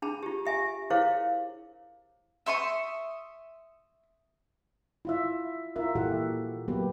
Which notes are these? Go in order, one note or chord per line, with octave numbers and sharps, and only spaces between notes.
D4 G#4 A5 B5
F4 G4
G4 E5 G#5
E4 G#4 A#4 C5 C#5 F5
E5 C6 C#6 D#6
E4 F4 E5
E4 F4 A#4 E5
A#2 E3 F#4 G4 A4 F#5
F#3 A#3 B3 G4 B4